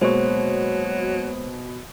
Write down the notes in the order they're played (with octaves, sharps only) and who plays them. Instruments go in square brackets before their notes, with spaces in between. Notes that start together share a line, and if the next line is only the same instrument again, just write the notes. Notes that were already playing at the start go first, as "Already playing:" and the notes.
[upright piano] B2 [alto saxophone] F#3 [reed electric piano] G#3 A#3 C#5 [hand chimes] C5